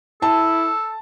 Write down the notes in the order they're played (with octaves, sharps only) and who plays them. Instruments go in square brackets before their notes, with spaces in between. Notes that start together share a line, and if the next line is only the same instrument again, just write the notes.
[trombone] E4 [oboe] A4 [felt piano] A5